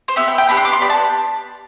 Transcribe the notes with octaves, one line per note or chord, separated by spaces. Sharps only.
C5
B3 E4 G4 E5
G5
G5
B3 D4 G4 B5
C6
D6
C6
B3 D4 G4 B5
A5